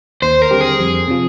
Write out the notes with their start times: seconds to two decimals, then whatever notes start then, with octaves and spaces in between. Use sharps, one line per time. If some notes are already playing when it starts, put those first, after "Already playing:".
0.22 D#2 C5
0.42 A#4
0.51 D3 G3 C4 G4
0.61 G#4
0.80 F2
1.08 C3 F3